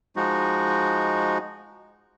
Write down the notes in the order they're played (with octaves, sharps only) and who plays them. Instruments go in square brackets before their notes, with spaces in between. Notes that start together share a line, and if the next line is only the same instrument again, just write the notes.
[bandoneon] F3 G#3 D#4 F#4